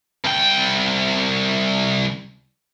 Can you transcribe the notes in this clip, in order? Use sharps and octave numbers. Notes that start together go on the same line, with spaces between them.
C2 G5